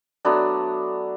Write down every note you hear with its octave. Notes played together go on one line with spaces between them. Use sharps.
F#3 A3 B3 D4